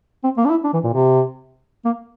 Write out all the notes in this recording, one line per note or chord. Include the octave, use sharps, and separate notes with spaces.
C4
A#3
D4
E4
D4
E3
A#2
C3
A#3